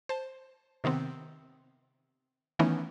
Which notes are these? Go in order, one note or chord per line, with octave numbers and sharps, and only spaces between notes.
C5 A5
C3 D#3 B3 C4
D#3 E3 A3 B3 C#4 D#4